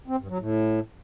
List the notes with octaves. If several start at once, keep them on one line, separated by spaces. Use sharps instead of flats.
C4
G2
F#3
A2